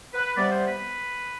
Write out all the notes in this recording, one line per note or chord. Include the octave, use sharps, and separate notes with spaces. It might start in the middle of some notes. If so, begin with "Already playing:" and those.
B4
C3 G3 B3 D5
C5
B4